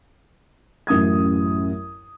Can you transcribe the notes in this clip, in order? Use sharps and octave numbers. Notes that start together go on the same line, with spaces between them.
A1 F#2 D#6 G#6